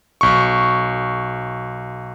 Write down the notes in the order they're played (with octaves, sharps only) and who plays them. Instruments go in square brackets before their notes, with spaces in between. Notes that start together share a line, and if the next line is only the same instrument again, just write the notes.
[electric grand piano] B1 C#6